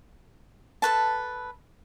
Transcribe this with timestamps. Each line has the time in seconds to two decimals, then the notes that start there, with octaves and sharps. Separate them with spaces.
0.82 A4 B4 A5